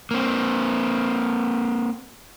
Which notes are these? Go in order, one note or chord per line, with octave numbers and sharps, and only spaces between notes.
A#3 C4